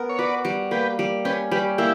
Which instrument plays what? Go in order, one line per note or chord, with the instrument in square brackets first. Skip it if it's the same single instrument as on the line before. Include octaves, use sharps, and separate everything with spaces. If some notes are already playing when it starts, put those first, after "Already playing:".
Already playing: [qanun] B3 A#4
[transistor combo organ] C#5
[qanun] F#4 [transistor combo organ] B4 D5
[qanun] G3
[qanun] A#3 [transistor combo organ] G4 B4
[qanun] G3
[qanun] C#4 [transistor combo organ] G4 B4
[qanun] G3 [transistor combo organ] G4 B4
[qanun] A#3 [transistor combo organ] E4 G4